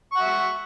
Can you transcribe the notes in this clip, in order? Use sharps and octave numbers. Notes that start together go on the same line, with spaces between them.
E5 F#5 C#6